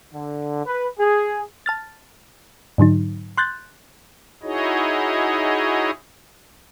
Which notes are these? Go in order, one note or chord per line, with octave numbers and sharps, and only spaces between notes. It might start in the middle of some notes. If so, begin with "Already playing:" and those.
D3
B4
G#4
A5 F6 A6
G#2 D3 F#3 D#4
C6 F#6 G6 A6
D#4 E4 F#4 G#4 C#5 D#5